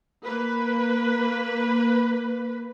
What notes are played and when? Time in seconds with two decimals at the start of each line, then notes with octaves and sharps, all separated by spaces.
0.22 A#3 B4